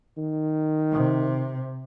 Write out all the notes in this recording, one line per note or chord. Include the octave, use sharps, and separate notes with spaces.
D#3
C3